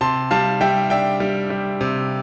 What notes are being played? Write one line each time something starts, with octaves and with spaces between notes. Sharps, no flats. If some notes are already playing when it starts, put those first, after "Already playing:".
C3 A5 C6
G3 F5 A5
G3 E5 G5
D4 E5 G5
G3
G3
C3